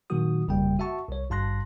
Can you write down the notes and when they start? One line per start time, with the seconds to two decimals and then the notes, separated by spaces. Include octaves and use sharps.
0.10 A#2 D#3 F#3 A#3 F#4 D#6
0.48 G1 F2 C#3 G3 A#3 G5
0.79 F#4 E5 F#5 A5 C#6
1.08 C2 C#5
1.30 G#1 G2 A5 C6 F#6 A#6